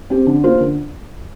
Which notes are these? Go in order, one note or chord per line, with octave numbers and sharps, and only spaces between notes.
C4 G4
D3
A#3 F4 C5
D3